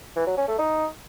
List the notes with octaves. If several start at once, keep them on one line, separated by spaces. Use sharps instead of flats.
E3
F#3
C#4
A3
D#4